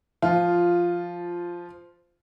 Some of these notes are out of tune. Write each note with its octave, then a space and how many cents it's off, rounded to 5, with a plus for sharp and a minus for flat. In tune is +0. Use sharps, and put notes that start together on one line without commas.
F3 -5 F4 +0